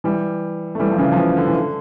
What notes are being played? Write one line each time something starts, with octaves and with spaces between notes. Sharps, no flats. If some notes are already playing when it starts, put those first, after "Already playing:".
E3 G3
A3
E3 G3
F3
C#3 E3
F3
C#3 E3
D3
E3
D3